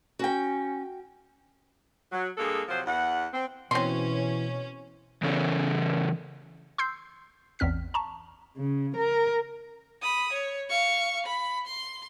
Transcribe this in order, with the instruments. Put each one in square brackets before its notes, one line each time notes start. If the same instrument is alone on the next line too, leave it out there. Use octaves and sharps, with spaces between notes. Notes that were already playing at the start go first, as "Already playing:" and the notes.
[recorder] C#4 [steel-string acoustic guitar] F#4 G5
[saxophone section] F#3
G2 G#3 A#3 G#4 A4
C3 F3 F#3 C5
E2 F#5
C4
[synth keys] B2 [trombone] E3 [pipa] C4 C6 [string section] C#4
[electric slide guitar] C#3 E3 C#4 A4
[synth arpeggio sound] C6 E6 G6 C7
A1 E2 C4 F6 B6
A5 A#5 C#6
[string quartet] C#3
A#4
[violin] B5 D#6
C#5
F5 C#6
B5
C6